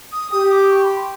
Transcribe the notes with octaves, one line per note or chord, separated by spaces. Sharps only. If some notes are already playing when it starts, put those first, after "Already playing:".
D#6
G4 D#6
D6
C#6
B5
C6